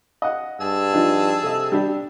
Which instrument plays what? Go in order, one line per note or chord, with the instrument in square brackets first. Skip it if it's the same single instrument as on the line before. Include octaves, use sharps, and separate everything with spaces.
[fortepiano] D#5 F#5
[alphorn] G2 [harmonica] G#4 A5 E6
[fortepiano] F3 D4 D#4
[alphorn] C3 [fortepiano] A4 D#5
[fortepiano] G3 D4 G4